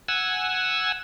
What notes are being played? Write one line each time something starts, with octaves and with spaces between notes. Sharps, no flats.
F#5 G#5 E6